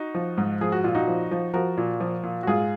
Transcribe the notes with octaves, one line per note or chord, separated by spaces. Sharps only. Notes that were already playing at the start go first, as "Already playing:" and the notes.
Already playing: D#4 F#4
F3
G#2
F3 G#4
F#4
A#2 F4
D#4 F#4
F3
F3
F3 F#4 A#4
A#2
F3
A#2
F#4
G#2 F4 G#4